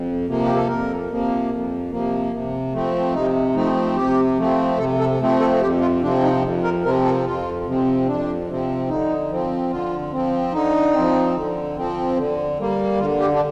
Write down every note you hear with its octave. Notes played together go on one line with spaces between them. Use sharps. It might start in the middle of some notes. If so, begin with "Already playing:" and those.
Already playing: F2
C3 F3 A#3
G4
A4
F2 A#4
C3 F3 A#3
F2
C3 F3 A#3
C3
F3 A3 C4
C3 D#4
F3 A3 C4 D#4
C3 G4
F3 A3 C4
C3 A4
A4
F3 A3 C4
A4
F2 G4
F4
C3 F3 C4 D4
D#4
F2
A#4
C3 F3 C4 A#4
A4
F2 F4
C3 F3 C4
F2 D4
C3 F3 C4
D3 D#4
F3 C4
D3 F4
F3 C4
D3 D#4
F3 C4
D3
F3 C4
D3
G3 A#3
D3 F4
G4
D4